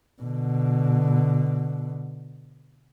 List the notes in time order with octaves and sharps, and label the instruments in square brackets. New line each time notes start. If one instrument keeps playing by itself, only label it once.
[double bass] B2 D3